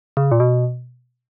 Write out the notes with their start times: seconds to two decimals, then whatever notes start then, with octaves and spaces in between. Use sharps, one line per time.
0.17 C#3
0.31 A#2
0.40 B2